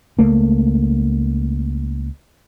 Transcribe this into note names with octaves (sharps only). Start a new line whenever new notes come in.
C#2 A3 A#3